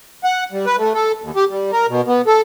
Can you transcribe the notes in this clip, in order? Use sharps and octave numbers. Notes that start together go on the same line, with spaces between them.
F#5
G3
B4
A3
A4
D#2
G4
G3
A#4
B2
B3
A4